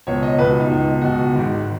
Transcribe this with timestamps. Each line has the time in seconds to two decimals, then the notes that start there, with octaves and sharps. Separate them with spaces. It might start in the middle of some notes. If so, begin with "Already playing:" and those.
0.07 C#2 B2 C#5
0.23 D#5
0.39 C#2 B4
0.42 B2
0.49 F#4
0.60 D#4
0.70 C#2 B2
1.01 C#2 B2 F#4
1.33 G#1 G#2 D#3